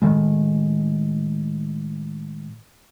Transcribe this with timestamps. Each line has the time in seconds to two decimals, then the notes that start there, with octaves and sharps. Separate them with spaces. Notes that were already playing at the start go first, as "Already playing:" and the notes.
0.02 A2 D#3 G#3